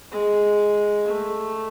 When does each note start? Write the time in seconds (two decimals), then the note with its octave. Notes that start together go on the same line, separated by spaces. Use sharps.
0.12 G#3
1.07 A3